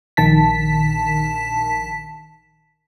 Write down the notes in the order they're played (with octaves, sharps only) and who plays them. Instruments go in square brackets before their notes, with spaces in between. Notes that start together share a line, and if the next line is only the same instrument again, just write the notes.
[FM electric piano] A#1 D#3 A5 B6